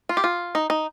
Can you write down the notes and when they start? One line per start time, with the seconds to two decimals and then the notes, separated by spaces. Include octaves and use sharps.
0.09 F4
0.17 G4
0.24 F4
0.55 D#4
0.70 D#4